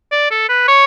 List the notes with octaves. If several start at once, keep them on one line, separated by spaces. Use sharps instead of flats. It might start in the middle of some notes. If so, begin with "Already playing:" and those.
D5
A4
B4
C#5